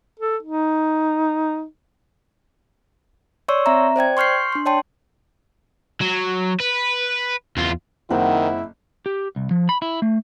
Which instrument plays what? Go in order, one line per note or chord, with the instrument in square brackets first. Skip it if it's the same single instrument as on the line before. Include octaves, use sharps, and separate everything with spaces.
[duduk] A4
D#4
[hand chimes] C#5 D5 C6 C#6 E6
C4 E5 A#5
C5 D5 G5 G#6
C6 C#6 F6 G6 C7
D4 C6
C#5 D5 G5 A5 C6
[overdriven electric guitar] F#3
B4
E2 F4
[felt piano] F#1 C4 [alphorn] D#3 [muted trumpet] E4 [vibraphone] F#5
[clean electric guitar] G4
C2
F3
B5
E4
A3